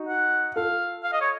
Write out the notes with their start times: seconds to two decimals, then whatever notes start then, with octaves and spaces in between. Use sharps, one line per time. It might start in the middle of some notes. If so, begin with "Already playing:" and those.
Already playing: D#4 F#4
0.08 F#5
0.56 F4 A4 F5
1.04 F5
1.13 D#5
1.21 C#5